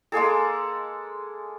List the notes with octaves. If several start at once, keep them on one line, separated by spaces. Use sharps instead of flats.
G#3 A#3 G#4 A4